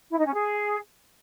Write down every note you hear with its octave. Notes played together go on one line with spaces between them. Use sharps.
E4
D#4
C#4
G#4